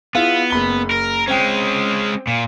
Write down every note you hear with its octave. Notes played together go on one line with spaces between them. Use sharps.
B3 E4 F4 G#4
F#1 B5 G7
A#4
G#3 C4 C#4 G5
A#2